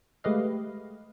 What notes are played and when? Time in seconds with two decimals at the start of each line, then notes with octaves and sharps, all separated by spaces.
0.24 G#3 A3 G4 B4 D#5 F5